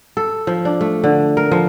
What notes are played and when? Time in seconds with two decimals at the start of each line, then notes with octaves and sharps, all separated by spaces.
0.17 A4
0.47 F3
0.65 D4
0.81 A3
1.04 D3
1.37 A#4
1.52 F3